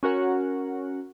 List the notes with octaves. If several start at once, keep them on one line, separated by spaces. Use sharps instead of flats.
C#4 F#4 A#4 F#5